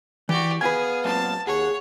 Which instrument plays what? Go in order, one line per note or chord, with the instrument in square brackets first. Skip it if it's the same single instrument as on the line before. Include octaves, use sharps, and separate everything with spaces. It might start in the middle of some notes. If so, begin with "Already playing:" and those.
[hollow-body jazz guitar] E3 [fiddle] F#4 G4 [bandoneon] D5
[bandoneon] B3 F5 [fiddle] G#4 [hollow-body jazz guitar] B4 G#5
[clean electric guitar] F#2 A#2 C4 [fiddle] A5
[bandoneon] D#2 F#5 F#6 [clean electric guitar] G#4 [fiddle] C#5